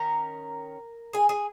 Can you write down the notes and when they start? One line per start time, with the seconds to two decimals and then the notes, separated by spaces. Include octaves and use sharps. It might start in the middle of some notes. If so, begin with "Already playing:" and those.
Already playing: D#3 C#4 A#4 A#5
1.13 G#4 G#5
1.29 G#4 G#5